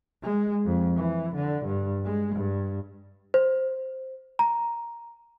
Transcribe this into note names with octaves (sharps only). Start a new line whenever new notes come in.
G#3
F2
E3
D3
G2
G#3
G2
C5
A#5